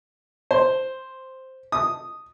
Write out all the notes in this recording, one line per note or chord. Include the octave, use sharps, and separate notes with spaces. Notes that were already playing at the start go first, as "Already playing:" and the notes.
C5
D#6